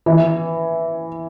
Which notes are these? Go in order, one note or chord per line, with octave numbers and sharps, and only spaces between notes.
E3